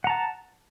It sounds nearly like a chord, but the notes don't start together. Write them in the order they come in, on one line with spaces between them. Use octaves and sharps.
F#5 A#5 A5